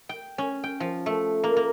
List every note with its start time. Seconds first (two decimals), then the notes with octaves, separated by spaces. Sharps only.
0.09 G5
0.38 C#4
0.64 G5
0.80 F3
1.06 A3
1.44 A#3
1.57 A#3